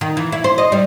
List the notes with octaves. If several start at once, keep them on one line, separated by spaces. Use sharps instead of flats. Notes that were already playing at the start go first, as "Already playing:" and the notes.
D#3
E3
E4
C5
D#5
G3